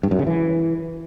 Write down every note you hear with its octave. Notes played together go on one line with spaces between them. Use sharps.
G2
F#2
C#3
E3